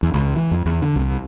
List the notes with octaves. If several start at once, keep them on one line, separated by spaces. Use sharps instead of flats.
E2
C#2
E3
F2
E2
D3
C2